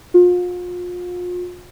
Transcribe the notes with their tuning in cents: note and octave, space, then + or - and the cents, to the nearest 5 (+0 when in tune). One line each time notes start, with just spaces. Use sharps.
F4 +35